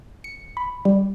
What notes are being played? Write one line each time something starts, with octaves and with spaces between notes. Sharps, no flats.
C#7
B5
G3